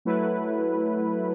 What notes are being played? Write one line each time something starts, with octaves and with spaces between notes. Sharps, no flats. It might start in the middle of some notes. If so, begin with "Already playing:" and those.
F#3 A3 E4 B4